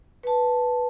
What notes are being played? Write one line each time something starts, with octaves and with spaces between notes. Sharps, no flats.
B4 A5